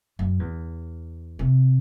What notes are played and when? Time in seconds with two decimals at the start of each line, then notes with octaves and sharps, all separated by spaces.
0.19 F#2
0.39 E2
1.39 C3